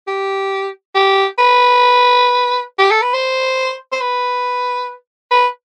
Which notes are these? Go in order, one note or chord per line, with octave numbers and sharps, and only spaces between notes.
G4
G4
B4
G4
A4
B4
C5
C5
B4
B4